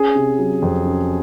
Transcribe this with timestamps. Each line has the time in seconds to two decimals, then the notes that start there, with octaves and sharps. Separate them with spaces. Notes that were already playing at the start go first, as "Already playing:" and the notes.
Already playing: C#4 G#4
0.15 C3
0.39 F#3
0.62 F2
0.85 C#4